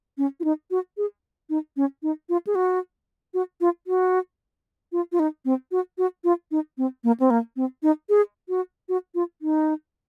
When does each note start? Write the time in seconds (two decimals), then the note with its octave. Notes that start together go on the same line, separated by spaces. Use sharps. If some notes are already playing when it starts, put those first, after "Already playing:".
0.18 C#4
0.40 F4
0.44 D#4
0.71 F#4
0.97 G#4
1.50 D#4
1.77 C#4
2.03 D#4
2.29 F4
2.47 G#4
2.55 F#4
3.34 F#4
3.61 F4
3.87 F#4
4.92 F4
5.12 F4
5.19 D#4
5.45 C4
5.72 F#4
5.98 F#4
6.24 F4
6.51 D#4
6.78 C4
7.04 A#3
7.20 C4
7.30 A#3
7.56 C4
7.83 D#4
8.09 G#4
8.49 F#4
8.89 F#4
9.15 F4
9.42 D#4